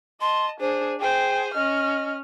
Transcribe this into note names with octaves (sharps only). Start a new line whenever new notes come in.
D#5 A5 C6
D4 G#4 C5
G#4 C5 G5
C#4 D#5 F6